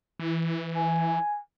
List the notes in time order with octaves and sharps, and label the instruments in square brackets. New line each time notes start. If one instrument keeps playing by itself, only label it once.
[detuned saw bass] E3
[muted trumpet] G#5